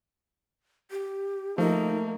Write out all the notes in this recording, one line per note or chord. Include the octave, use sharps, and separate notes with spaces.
G4
F3 A3 A#3 D#4